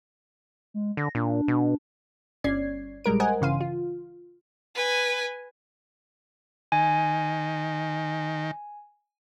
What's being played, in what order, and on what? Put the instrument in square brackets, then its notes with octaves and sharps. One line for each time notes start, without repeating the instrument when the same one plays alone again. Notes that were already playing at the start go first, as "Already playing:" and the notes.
[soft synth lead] G#3
[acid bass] D3 [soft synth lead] A#6
[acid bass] A#2 [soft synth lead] D4
[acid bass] B2
[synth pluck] G1 C#4 D5 G#6 C7
A#1 G3 G#3 A#4 D7
A#4 C5 D#5 F#5 G#5
G1 C#3 E3 F5 C6 D#7
F4
[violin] B4 G#5
[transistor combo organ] D#3 [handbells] G#5